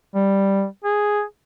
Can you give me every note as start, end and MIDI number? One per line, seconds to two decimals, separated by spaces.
0.15 0.65 55
0.84 1.22 68